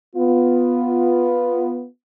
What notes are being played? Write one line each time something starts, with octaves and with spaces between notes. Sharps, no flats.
B3 F4